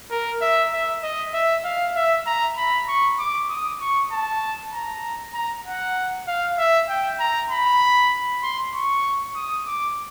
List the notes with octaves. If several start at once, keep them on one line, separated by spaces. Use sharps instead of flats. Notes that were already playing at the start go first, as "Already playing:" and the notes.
A#4
E5
E5
D#5
E5
F5
E5
A#5
B5
C#6
D6
D#6
C#6
A5
A#5
A#5
F#5
F5
E5
G5
A#5
B5
C6
C#6
D#6
D6